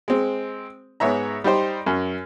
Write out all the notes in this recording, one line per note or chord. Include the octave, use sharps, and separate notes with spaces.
G#3 C4
G#2 B3 C#5 E5 A#5
G3 D#4 G4 C5
F#2 C#4